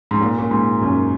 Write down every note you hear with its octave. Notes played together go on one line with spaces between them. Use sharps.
G#2
A#2
A#2
G#2
F#2